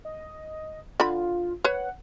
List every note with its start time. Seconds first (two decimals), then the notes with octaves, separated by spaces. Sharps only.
0.05 D#5
1.00 D3 F4 B5
1.64 B4 C#5 F#5